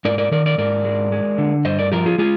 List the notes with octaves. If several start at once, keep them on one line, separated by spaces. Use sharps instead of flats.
G#2 A#4 D5
A#4 D5
D#3 A#4 D5
A#4 D5
G#2 A#4 D5
G#3
G#3
D3
G2 C5 D#5
A#4 D5
F3 G4 A#4
F4 G#4
G#3 F4 G#4